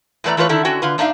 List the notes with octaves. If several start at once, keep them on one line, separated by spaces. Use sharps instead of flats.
E2 E3 A3 B4 D5 A#5
E3 A3 F4 B4 C#5
D3 D#3 E4 A4
D3 C#4 F#4 G5
D3 F4 B4
A#2 D4 D#4 E5 F5